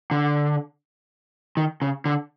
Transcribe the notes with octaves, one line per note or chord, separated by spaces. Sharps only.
D3
D#3
C#3
D3